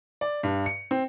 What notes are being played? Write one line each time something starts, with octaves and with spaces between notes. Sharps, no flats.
D5
G2
C#7
C4